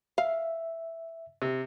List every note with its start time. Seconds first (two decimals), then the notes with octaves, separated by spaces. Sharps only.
0.18 E5 F5
1.42 C3